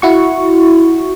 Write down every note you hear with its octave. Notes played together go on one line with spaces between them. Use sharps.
E4 F#4 C#6